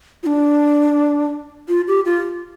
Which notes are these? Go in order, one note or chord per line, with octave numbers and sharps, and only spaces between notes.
F4
D4
F4
G4
F4